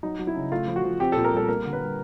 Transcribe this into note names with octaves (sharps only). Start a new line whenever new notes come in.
F#3 D#4
F#3
E4
C#3
A3 F4
F3
F#4
F3
C4 G4
A4
A#2
A#4
G3 A4
A#3 A#4
D3
B4
G3